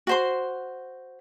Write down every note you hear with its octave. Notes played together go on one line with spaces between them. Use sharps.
F#4 C5 C6